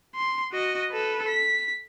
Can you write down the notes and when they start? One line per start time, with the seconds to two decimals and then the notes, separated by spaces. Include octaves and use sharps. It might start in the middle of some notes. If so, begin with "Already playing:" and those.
0.15 C6
0.52 F#4 D#5
0.91 A4 B4
1.28 B6